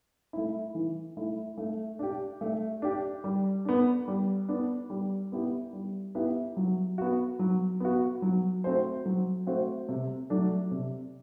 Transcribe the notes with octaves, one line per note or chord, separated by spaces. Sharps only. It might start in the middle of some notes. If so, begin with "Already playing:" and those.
A3 E4
E3
A3 E4
A3
D4 G4
A3
D4 G4
G3
B3 D4
G3
B3 D4
G3
B3 E4 G4 B4
G3
B3 E4 G4 B4
F#3
B3 F#4
F#3
B3 F#4
F#3
A3 C4 F#4 C5
F#3
A3 C4 F#4 C5
C3
F#3 A3 D4 A4
C3